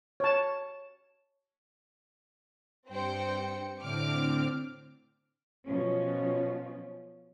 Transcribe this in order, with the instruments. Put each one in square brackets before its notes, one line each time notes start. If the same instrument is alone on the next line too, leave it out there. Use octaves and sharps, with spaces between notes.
[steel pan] C#5 A5
[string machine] G2 C#7 [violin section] C4 C5 G5
[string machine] A2 D3 C4 [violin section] D6 F6
[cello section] B2 F3 C#4